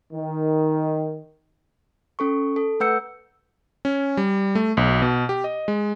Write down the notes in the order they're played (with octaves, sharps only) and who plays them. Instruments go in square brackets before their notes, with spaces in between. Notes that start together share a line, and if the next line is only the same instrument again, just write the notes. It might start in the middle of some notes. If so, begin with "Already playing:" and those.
[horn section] D#3
[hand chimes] C#4 A4 C#6
A4
A3 B4 F#5 E6 G6 C#7
[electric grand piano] C#4
G3
A3
B1
B2
G4
D#5
G#3